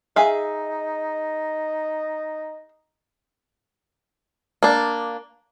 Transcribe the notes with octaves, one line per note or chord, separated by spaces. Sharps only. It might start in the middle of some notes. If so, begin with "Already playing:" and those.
D#4 G#4 E5 F5
A#3 D4